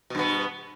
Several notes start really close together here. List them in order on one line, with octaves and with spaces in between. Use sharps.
B2 G2 B3